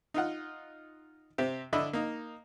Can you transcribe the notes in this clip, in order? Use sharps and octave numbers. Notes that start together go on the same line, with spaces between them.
D#4 F4 F#5
C3 C4 G4
D3 D4 E4 D#5 B5
A#3 D#4